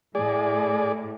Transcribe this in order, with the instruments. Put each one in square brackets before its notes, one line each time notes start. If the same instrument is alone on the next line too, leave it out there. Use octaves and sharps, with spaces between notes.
[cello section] A2 [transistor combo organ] G#4 D5